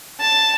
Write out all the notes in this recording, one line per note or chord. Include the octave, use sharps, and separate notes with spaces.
A5